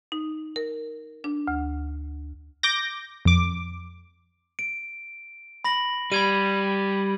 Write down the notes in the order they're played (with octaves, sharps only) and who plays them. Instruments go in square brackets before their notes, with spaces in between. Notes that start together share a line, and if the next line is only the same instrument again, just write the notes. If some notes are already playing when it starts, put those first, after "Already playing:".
[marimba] D#4
A#4
D4
D2
[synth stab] D6 G6 A#6
F2 D6
[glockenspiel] D7
B5 A#6 F#7
[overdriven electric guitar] G3 [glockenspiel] B5 G#6 D#7